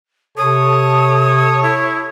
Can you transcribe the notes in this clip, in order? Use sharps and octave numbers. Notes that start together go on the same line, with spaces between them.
C3 A4 C#5 D#6
E4